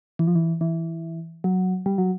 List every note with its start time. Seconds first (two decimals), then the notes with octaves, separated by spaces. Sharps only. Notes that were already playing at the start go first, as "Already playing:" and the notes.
0.19 E3
0.27 F3
0.35 E3
0.61 E3
1.44 F#3
1.86 G3
1.98 F#3